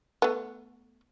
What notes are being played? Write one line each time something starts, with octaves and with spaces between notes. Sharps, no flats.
A3 B3